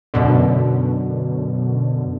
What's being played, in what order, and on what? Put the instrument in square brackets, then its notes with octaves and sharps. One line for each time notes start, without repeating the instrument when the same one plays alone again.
[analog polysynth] F#2 B2 D3